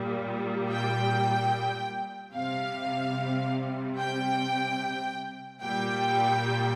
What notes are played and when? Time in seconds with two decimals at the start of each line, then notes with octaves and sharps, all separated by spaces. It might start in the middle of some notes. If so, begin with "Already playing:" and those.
Already playing: A#2 G3
0.71 G5
2.35 C3 G3 F5
3.98 G5
5.62 A#2 G3 G5